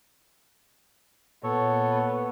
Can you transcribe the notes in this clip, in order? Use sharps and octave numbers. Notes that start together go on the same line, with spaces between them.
A#2 B3 A4 C#5